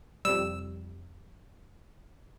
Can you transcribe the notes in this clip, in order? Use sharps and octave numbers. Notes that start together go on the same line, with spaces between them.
F2 C3 G3 E6